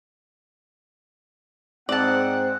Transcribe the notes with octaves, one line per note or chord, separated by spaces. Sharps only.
G#2 C4 D5 F#5 A5